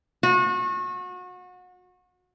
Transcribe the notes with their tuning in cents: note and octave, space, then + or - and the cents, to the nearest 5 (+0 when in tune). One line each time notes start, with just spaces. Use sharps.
F#4 -30